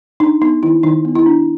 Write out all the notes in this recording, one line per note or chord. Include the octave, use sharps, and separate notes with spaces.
D4 D#4
B3 D#4
D#3 E4
D#3 D#4
B3
E4
D4